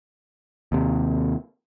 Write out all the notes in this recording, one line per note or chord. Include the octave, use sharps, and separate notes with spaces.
D#2 C3